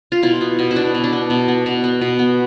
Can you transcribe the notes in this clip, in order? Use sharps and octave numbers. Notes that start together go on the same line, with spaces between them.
F4
B2 E4
B3
B2
E4
B3 D4
B2
D4
B3
B2
B3
B2
B3
B2
B3